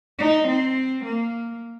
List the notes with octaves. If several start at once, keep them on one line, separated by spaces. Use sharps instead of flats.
D#4
C4
A#3